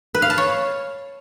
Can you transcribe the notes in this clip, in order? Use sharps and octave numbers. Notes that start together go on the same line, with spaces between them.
B4
F5
A5
C#5